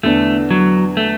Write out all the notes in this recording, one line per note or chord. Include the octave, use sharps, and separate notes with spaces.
E2 D3 A3 B3 D4
F#3
A3